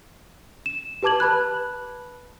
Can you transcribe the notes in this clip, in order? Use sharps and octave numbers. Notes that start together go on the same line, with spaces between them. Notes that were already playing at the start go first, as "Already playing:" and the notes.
E7
G4 B4 A5 D6 G#6 F#7
B4 A5 B5 F#6